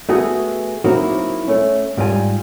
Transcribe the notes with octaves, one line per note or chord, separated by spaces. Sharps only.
A3 B3 F#4 G#4
F#3 A#3 C4 D#4 E4 F#4
A3 C#4
G#2 G3 F4 A#4 G#5